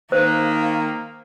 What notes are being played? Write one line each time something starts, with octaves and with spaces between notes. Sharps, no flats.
D#3 A#3 C5 F5